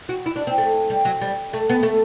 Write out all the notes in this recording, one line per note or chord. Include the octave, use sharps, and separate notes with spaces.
F#4
E4
D4
C4
A3
G3
F#3
G3
A3
B3
A3